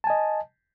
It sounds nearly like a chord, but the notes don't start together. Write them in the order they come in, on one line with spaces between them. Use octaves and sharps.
A5 G#5 D#5